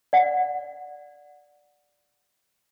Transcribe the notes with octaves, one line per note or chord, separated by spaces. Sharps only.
D5 F#5